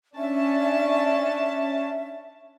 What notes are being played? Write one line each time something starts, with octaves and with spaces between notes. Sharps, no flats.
C#4 D4 E5 A5